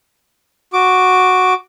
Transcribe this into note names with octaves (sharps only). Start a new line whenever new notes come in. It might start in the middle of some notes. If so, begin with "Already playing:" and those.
F#4 D6